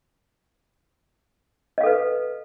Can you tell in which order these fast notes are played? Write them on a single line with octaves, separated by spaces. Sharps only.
D#5 F5 A4 B4